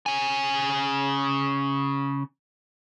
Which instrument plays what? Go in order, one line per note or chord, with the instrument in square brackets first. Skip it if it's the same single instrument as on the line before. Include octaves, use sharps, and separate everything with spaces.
[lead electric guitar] C#3 G#5